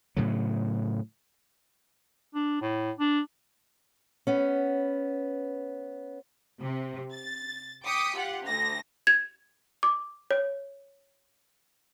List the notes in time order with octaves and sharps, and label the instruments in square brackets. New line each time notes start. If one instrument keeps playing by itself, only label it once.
[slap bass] A2 C#3 F#3
[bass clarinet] D4
A2
D4
[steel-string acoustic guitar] B3 C#4
[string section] C3
A6
G5 D6 D#6 B6 C#7
F4 G4 F#5
D2 A#6
[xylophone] G#6
D6
C#5